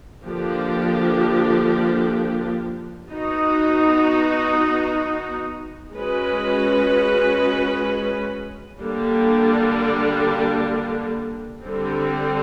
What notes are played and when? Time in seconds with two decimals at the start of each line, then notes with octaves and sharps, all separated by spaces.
0.22 D3 F3 A#3 D4 G4
3.07 B3 D#4 F#4
5.92 G#3 C#4 F#4 B4
8.78 D3 G3 A#3 D4
11.63 D3 G3 C4